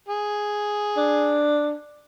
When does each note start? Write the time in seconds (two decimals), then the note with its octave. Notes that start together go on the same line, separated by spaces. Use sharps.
0.08 G#4
0.97 D4